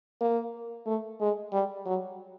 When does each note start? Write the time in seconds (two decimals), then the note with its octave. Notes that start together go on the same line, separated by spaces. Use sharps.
0.21 A#3
0.86 A3
1.21 G#3
1.53 G3
1.86 F#3